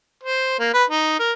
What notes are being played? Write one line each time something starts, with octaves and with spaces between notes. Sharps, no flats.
C5
A#3
B4
D#4
A#4